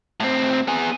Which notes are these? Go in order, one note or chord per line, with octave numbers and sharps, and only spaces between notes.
A2 C4
B3 G#4